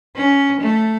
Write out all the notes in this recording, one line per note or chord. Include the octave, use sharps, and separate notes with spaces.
C#4
A3